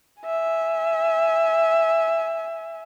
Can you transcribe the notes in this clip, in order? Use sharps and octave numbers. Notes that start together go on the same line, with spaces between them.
E5 G#5